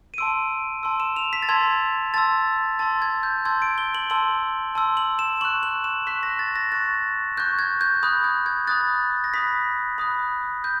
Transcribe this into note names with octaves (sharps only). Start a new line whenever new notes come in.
D#7
A5 C6 E6 D7
A5 C6 E6
E7
F7
B6
A6
A5 C6 E6 G#6
A5 C6 E6 A6
A5 C6 E6 A6
G#6
G6
A5 C6 E6 G#6
D7
G7
F#7
A5 C6 E6 F#7
A5 C6 E6
F#7
E7
C#6 F#6 F#7
F#7
E7
C#6 F#6 B6
A#6
A6
A#6
C#6 F#6 A6
C#6 F#6 G6
G#6
G6
B5 D#6 F#6 G6
G#6
G#6
B5 D#6 F#6 A6
A#6
B5 D#6 F#6 B6
B5 D#6 F#6
G6